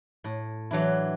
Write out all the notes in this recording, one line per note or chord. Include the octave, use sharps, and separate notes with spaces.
A2
E3 F#3 D4 E4